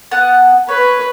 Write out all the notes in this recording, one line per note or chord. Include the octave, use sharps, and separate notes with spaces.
B3 F#5 A5
B4 C#5